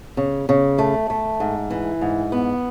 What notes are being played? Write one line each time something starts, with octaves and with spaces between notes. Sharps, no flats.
C#3
C#3
A3
A3
G#2
E3
G#2
B3